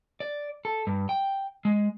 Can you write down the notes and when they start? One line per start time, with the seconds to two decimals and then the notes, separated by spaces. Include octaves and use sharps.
0.20 D5
0.65 A4
0.87 G2
1.09 G5
1.65 G#3